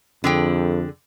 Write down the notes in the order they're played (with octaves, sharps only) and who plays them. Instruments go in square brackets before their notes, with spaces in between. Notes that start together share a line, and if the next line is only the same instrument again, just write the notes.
[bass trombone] F2 [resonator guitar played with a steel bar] D3 G#4 G5